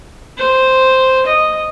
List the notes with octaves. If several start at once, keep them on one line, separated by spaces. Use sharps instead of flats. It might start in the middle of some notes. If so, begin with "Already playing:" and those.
C5
D#5